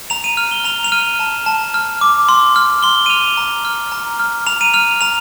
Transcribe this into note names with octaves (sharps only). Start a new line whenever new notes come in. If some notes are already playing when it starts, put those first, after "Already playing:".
A#5 F7
D#7
F6 F7
G7
A#5 F7
F7
F6 D#7
A5
A5
F6
D6
C6
F6
C6 G7
D#7
F6 F7
A#5
F6
A#5
F6
A#5 F7
D#7
F6 F7
A#5 F7